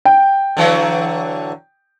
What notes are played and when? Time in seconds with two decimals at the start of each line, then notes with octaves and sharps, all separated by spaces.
0.05 G5
0.57 D3 E3 F#3